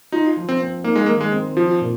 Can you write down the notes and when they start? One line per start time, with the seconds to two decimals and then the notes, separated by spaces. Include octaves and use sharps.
0.12 D#4 F4
0.37 F3
0.49 C4
0.60 C4
0.84 A#3 D#4
0.96 G#3
1.06 D#3 A#3
1.21 G#3
1.33 C4
1.57 F3 F4
1.81 A#2